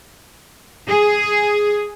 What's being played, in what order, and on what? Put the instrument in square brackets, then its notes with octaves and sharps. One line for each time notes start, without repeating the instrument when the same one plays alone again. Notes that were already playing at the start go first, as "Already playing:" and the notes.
[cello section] G#4